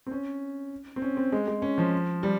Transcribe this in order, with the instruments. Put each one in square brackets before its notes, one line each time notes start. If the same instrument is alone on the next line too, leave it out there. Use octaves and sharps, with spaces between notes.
[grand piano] C4
C#4
C4
C#4
C4
G#3
G#3
C#4
F3
G3